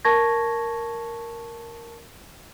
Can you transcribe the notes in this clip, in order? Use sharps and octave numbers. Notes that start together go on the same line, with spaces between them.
A#4 A5 C#6 G#6 A#6